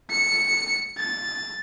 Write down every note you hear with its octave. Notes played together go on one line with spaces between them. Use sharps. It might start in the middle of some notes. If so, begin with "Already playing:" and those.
C#7
A6